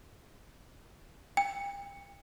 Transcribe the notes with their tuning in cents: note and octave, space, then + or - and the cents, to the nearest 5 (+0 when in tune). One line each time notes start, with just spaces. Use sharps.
G5 +35